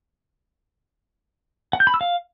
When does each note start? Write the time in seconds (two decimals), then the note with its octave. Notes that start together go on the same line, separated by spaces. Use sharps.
1.73 F#5
1.80 G6
1.87 B5
1.94 E6
2.01 F5